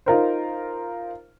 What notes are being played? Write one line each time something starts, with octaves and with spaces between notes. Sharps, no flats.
D#4 F4 A#4 C5